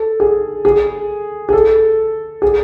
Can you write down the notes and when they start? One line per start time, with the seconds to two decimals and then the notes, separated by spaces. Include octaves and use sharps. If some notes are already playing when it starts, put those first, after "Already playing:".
Already playing: A4
0.20 G#4
0.65 G#4
1.49 G#4
1.53 A4
2.42 G#4